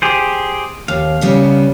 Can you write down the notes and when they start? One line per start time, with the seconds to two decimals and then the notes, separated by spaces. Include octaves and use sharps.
0.02 G4 G#4 C5
0.88 D#2 F5
1.21 C#3 G3 B3